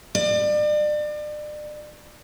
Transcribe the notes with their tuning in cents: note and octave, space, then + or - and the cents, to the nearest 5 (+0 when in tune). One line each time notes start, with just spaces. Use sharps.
D5 +35